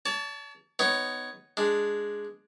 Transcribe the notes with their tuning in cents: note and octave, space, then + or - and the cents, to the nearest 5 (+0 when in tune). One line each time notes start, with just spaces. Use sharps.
C#5 +45 A5 +0
B3 +20 D#4 +0 C#5 +0
G#3 +0 D4 +0